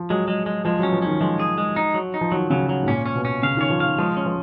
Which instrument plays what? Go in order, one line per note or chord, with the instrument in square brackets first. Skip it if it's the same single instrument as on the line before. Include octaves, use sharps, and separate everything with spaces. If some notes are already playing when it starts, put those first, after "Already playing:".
Already playing: [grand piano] F3
[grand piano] F#3 [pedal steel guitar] G#3
[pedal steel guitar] G#3
G#3
[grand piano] F3 [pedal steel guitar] G#3
[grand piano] F#3 [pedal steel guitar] C#4
[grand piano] F3
[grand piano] D#3 [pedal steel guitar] C#4
[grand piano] F3 [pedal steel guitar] G#3
[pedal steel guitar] G#4
G#3
D#4
F#3
D#4
[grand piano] F3
[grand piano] D#3 [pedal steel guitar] F#3
[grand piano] C#3 [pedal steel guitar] F#3
[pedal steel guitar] F#3
[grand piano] G#2
[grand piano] A#2 [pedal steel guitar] C#4
[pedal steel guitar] C#4
[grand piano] B2
[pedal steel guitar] C#4
[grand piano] C#3 [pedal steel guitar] F5
[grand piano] D#3 [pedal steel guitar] C#5
[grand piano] F3
[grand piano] D#3 [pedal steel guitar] F5
[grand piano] F3 [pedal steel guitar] G#3
[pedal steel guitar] C#4
[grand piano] F3